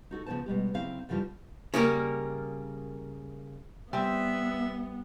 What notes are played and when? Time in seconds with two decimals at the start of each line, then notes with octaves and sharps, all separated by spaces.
0.11 D#4 F#4 A4
0.26 C#3 F3 B3 C4 C5 A5
0.46 B2 G3 G#3 G4
0.74 C#3 F#3 C4 E4 F5
1.09 F#2 C#3 E3 F3 G3 F4
1.74 C#3 G3 A#3 A#4
3.93 G3 B3 C4 E5